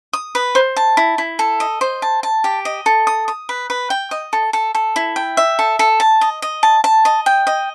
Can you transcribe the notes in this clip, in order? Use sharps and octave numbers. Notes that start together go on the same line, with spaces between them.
D#6
B4
C5
A5
E4
E4
A4
D#5
C5
A5
A5
G4
D#5
A4
D#6
D#6
B4
B4
G5
D#5
A4
A4
A4
E4
G5
E5
A4
A4
A5
D#5
D#5
A5
A5
D#5
G5
D#5